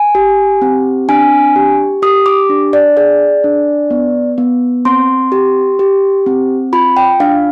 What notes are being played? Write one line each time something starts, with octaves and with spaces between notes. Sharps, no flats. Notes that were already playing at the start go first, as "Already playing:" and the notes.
Already playing: G#5
G4
C4
D4 G#5
G4
G4 D#6
D6
D4
D5
G#4 D5
D4
B3
B3
C4 C6
G4
G4
C4
F4 B5
G5
D4 F5